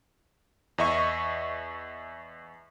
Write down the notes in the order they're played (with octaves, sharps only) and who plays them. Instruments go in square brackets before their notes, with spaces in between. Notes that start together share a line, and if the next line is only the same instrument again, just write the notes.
[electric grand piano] E2 D#5 E5 C#6